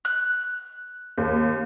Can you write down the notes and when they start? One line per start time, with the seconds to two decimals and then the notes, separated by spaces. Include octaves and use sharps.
0.05 F#6
1.18 D#2